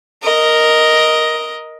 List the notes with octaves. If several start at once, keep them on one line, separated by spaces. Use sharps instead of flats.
A#4 D#5